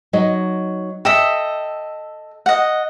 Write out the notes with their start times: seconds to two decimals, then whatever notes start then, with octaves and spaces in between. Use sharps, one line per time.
0.13 F#3 D#4 D#5
1.05 A4 D#5 E5 G5
2.46 D#5 F#5